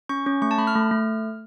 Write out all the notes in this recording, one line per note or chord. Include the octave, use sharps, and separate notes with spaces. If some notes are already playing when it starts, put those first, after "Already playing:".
C#4 C#6
C#4
A3 C#6
A5
A3 B5
F6
A3
A3